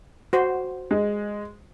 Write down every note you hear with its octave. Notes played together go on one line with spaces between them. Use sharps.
F#4 C5
G#3